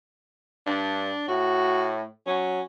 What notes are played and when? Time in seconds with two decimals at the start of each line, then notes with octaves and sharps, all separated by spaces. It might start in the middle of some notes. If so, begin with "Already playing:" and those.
0.66 G2 D4
1.28 A2 F#4
2.26 F#3 C#4